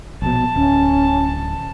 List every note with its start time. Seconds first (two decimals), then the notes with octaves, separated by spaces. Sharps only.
0.22 A#1 B2 A5
0.56 D1 C#4